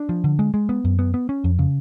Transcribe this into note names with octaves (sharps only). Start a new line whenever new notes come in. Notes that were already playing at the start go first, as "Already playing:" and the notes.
Already playing: D4
F3
D3
G#3
G#3
B3
F#2
B3
B3
C#4
F2
C#3